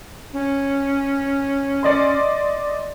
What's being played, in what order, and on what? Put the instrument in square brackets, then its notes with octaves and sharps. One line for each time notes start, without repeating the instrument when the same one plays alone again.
[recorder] C#4
[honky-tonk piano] D5 D#5 C6